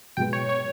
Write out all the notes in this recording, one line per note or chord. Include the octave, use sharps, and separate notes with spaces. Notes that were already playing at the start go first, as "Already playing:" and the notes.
B2 G#3 B3 G5
C#5
C#5